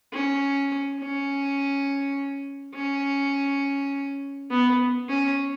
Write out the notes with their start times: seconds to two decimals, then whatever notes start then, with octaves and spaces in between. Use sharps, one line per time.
0.13 C#4
0.99 C#4
2.75 C#4
4.50 B3
5.09 C#4